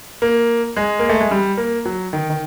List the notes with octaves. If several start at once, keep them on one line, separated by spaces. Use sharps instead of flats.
A#3
G#3
A#3
A3
G#3
G3
A#3
F#3
D#3
D#3